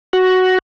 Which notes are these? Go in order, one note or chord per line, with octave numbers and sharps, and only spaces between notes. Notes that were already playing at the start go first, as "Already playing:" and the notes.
F#4